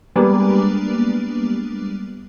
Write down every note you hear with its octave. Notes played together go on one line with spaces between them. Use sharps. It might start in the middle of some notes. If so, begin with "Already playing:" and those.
G3 G#3 A#3 B3 D4